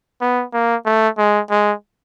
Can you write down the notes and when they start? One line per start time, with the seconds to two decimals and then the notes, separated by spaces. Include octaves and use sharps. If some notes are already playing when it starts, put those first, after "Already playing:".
0.21 B3
0.53 A#3
0.86 A3
1.18 G#3
1.50 G#3